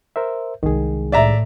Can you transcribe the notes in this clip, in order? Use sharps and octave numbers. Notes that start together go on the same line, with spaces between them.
A#4 C5 E5
C2 D#3 G#3 G#4
A2 D5 E5 A#5